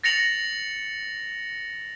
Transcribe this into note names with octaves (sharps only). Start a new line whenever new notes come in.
A6 A#6 C#7 F7 F#7